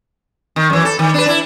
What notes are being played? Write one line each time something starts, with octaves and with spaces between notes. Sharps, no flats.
D#3
F#2 E3
A4
D#3
D4 B4
D4 E4